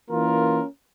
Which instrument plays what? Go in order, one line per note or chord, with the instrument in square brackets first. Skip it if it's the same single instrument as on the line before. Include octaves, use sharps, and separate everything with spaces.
[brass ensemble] E3 A#3 C#4 F4 A#4